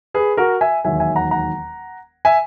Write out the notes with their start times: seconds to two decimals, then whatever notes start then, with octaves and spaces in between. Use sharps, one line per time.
0.14 G#4 B4
0.37 F#4 A#4
0.61 E5 G#5
0.84 E1 D#2 D#3 F#3 E5 G#5
1.00 E5 G#5
1.16 F#5 A#5
1.31 F#5 A#5
2.25 E5 G#5